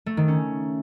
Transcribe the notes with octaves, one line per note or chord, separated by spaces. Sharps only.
A3
D#3
C#4